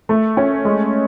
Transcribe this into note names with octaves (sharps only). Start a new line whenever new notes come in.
A3
C#4
G#3